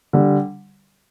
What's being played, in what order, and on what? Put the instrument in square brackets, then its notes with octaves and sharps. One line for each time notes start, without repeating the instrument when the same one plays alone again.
[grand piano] D3 G3